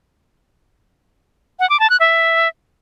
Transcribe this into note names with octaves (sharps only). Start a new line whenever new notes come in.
F#5
D6
A5
F#6
E5